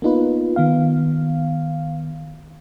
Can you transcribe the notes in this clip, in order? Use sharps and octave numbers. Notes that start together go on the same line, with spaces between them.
A#3 B3 D#4 F4 B4
D#3 B3 F5